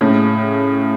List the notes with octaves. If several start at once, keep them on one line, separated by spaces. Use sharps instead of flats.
A2 C#3